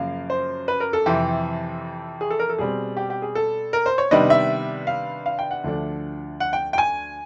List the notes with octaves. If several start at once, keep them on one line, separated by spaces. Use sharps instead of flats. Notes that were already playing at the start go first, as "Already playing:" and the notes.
Already playing: F#2 C#3 F3 A#3 F5
C5
B4
A#4
A4
F2 C3 E3 G4
G#4
A4
A#4
A4
B2 G3 C4 G#4
G4
G4
G#4
A4
A#4
C5
C#5
C3 D#3 G3 B3 D4 D#5
E5
F5
F5
G5
F#5
D2 D3 F3 A3 D4
F#5
G5
G5
G#5